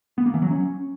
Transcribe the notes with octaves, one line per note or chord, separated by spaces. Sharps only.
B3
A#3
E3
F#3
C#4